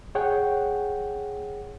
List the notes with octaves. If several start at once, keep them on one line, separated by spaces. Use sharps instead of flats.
G#4 C#5 F#5 G5